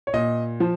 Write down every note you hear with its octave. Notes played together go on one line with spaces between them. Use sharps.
C#5
A#2 D#5
F3